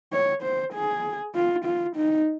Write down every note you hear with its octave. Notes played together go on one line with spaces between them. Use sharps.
C#5
C5
G#4
F4
F4
D#4